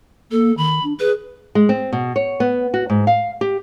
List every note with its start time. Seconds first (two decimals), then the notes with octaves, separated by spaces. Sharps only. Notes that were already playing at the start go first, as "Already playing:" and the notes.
0.31 A#3 A4
0.57 D#3 B5
0.84 D4
1.00 G#4 B4
1.55 G#3
1.69 C4
1.93 B2
2.16 C#5
2.40 B3
2.74 F#4
2.90 G#2
3.07 F5
3.41 G4